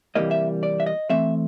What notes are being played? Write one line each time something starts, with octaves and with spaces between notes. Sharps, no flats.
C3 E3 G3 A#3 D#5
E5
D5
E5
D#5
E3 A3 C4 E5